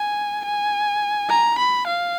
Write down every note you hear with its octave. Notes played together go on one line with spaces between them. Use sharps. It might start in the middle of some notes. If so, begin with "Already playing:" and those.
Already playing: G#5
G#5
A#5
B5
F5